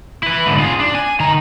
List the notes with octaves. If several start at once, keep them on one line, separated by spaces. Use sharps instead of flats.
E4 B4
G#2 D3
F4 G#4
D4
G#5
D#3 A#5